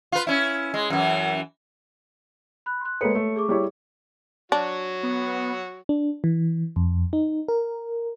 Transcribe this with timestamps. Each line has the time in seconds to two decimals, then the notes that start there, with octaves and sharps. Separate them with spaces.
0.12 F4 B4
0.27 C#4 E4
0.74 G#3
0.90 F#2 E3
2.66 B5 F#6
2.81 C6 F#6
3.01 G#3 A#3 A4 B4 C#5 C#7
3.15 A3
3.36 G#4 C#6 D6
3.49 G3 E4 C#5
4.52 F#3 D4 F#4
5.03 B3
5.89 D4
6.24 E3
6.76 F2
7.13 D#4
7.48 A#4